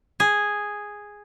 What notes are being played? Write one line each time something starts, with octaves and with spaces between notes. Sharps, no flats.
G#4